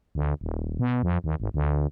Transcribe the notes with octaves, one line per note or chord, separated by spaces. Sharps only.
D2
D#1
B2
F2
D#2
G#1
D2